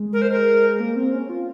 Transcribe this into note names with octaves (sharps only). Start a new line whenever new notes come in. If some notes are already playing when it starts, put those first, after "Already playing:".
Already playing: G#3
A#4
C5
A#4
A#3
C4
C#4
F4